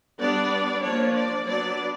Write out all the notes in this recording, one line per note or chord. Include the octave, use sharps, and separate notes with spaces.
G3 B3 D4 D5
F3 A#3 D4 C#5
D5
F#3 B3 D4 D5